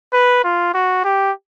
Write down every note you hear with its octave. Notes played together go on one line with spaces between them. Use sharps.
B4
F4
F#4
G4